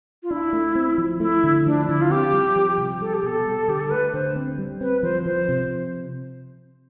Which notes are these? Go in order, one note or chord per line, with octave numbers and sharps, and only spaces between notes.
F4
D4 E4
A3
C4
F3
A3 E4
D3
F3 D4
D3 E4
F4
C4 G4
G3
F3
C3
G3 A4
G4
B2 A4
G3
D3 G4
A4
A3 B4
D3 C5
C4
G3
C4 B4
F3 C5
F3 C5
C3